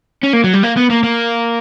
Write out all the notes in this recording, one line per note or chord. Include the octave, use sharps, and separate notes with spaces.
C#4
A#3
F#3
G3
A#3
B3
A#3
A#3